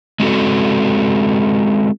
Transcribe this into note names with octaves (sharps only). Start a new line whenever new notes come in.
G#3 C4 F#4 A4